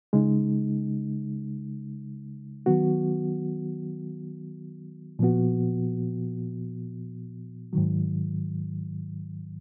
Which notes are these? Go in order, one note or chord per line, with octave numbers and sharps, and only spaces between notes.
C#3 G#3 D#4
D#3 F#3 B3 F#4
A#2 F3 B3 F#4
G#2 D#3 F#3